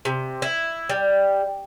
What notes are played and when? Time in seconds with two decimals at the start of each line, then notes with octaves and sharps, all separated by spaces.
0.05 C3
0.42 E4
0.89 G3